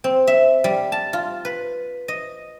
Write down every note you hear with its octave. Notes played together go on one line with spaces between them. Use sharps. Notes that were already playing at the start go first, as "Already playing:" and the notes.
C4
E5
G3
A5
F4
B4
D#5